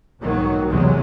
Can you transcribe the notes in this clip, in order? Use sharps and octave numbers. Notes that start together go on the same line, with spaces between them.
B1 G#2 D#3 F#3 A#3
B1 E2 C3 F#3 G#3